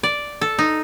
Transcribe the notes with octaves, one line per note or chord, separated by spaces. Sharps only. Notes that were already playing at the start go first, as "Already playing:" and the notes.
D5
A4
D#4